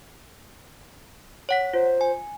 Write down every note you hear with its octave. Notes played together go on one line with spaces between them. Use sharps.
C#5 F#5 B6
F4 C5
G#5